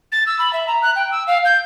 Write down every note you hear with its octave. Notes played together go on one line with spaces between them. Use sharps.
A6
E6
B5
E5
A#5
F#6
G5
E6
F5
G6